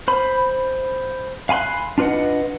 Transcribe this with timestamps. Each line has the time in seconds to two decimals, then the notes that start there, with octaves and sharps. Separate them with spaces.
0.08 C5 B5
1.49 F5 G#5 B5 C6 F#6
1.98 D4 F4 B4 D#5 F#5